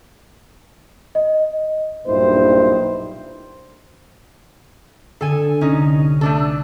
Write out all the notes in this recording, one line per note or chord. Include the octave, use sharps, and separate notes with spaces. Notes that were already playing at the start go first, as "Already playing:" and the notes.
D#5
B1 G2 A#2 D#4 E4 C5
D3 A4 G#5
C2 C#4 D#4
A3 D4 A4